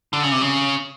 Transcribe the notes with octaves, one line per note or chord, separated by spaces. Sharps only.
D3
C#3
C3
C#3